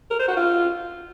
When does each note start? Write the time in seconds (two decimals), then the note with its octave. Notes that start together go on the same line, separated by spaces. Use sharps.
0.11 A#4
0.19 C5
0.28 F#4
0.37 F4